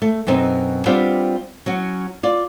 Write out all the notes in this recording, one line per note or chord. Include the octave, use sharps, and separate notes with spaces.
A3
F#2 B2 C4 D#4
G3 B3 C4 D4 F4 G4
F#3 C#4 F#4
F4 D5